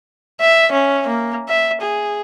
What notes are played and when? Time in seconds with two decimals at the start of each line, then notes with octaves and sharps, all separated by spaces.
0.41 E5
0.72 C#4
1.07 A#3
1.49 E5
1.81 G#4